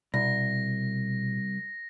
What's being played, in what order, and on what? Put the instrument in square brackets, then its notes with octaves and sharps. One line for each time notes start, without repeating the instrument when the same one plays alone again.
[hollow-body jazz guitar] C2 [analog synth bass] B2 [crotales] A#6